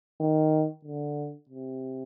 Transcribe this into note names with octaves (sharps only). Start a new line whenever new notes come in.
D#3
D3
C3